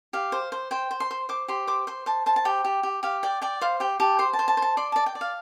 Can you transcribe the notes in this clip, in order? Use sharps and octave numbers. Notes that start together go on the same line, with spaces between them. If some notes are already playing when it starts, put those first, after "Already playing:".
G4 F5
C5
C5
C5 G5
C5
C6
C5
C5 D6
G4 C6
C5 D6
C5 C6
C5 A5
C5 A5
A5
G4 G5
G4
G4
G4 F5
D5 G5
D5 G5
C5 F5
G4 G5
G4 A5
C5 C6
A5
C5
A5
C5
A5
D5 C6
D5 A5
G5
D5
F5